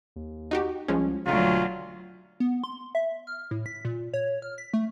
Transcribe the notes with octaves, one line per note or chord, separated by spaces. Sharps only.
D#2
D#4 F#4 G4
C2 F3 G#3 C#4
E1 D2 F#3 F4
B3
C6
E5
F6
A2
B6
A#2
C#5
F6
B6
A3